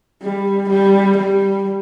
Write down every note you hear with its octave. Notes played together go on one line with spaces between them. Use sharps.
G3
G3
G3